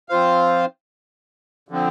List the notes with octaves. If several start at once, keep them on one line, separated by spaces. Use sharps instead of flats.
F3 C4 F4 C5 F5
D3 F3 C4